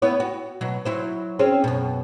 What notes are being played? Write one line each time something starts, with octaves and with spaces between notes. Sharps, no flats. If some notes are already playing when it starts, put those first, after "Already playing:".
B3 E4 C#5
F#4
B2 F#3
F#3 E4 C5
C4 C#4 G#4
F#2 B2